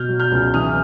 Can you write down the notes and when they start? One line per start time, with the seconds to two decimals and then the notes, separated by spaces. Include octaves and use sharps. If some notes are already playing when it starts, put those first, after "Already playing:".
Already playing: B2 F6 G6
0.09 F#3
0.20 F6 G6
0.32 C#2
0.54 E3 D#6 F6